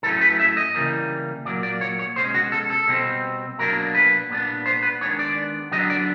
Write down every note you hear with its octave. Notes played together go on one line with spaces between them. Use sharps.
A2 F#3 A3 C#4 A4
B4
E5
D#5
C#3 E3 G3 A#3
A#2 F#3 A#3 D5
D5
C#5
C#5
B2 G#3 C#4 C5
F#4
A4
A4
B2 G3 C4
B2 F#3 A#3 D4 A#4
B4
A#2 G3 B3 D4
C5
B4
D#3 G#3 B3 D4 C#5
D5
D3 F#3 B3 D4 D#5
D5